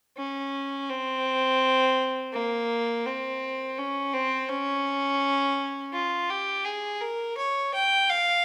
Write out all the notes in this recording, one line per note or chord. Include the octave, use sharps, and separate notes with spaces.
C#4
C4
A#3
C4
C#4
C4
C#4
F4
G4
G#4
A#4
C#5
G5
F5